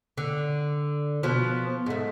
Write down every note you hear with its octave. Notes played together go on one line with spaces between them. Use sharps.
D3
B2 F3
G#2 A3